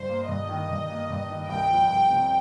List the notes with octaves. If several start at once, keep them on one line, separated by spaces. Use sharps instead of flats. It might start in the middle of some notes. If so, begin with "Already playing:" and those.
Already playing: G2 C5
A#3
G2 D#5
D#3
G2
A#3
G2
D#3
C2 G5
F3
C2
C3